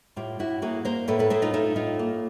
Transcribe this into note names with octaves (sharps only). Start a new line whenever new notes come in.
A2 F4 G4
A2 E4 F#4
A#3 F#4 G#4
A#3 A#4 C5
A2 A4 B4
A4 B4
A3 G#4 A#4
D#4 F4
A3 D#4 F4
A2 D#4 F4
A#3